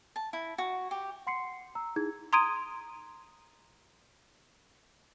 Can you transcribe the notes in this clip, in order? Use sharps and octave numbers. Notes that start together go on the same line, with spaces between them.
A5
E4
F#4
G4
F#5 C6 C7 C#7
A#5 E6
D#4 E4 G#4 G#6
A#5 C6 D#6 G#6 D7 D#7